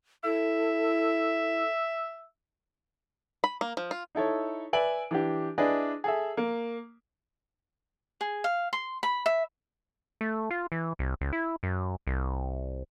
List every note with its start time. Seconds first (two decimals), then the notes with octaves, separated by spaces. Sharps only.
0.24 E4 A4 E5
3.44 B5
3.61 A#3
3.77 F3
3.91 F4
4.15 D#4 E4 A4 C#5
4.73 B4 D5 E5 G#5 D7 F#7
5.11 E3 D4 G4
5.58 D4 E4 G#4 B4 D5 D#5
6.04 G#4 A4 E5
6.37 A#3
8.21 G#4
8.44 F5
8.73 C6
9.03 B5
9.26 E5
10.21 A3
10.51 F4
10.72 E3
10.99 C2
11.21 C#2
11.33 E4
11.63 F#2
12.07 C2